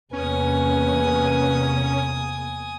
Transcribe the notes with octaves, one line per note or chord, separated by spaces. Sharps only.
E2 C3 A#3 C#4 B4 G#5 D#6